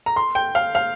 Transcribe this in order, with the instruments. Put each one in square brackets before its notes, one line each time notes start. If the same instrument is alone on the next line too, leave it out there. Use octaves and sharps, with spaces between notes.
[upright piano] A#5
C6
G5
F5
F5